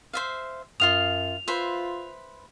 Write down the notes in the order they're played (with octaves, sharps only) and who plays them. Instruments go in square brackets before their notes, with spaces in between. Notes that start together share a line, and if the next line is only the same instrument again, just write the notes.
[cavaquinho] C5 E5 F5
[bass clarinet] F#2 [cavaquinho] F4 F5 D#6 [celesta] F7
[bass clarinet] F4 [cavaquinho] B4 C5 E5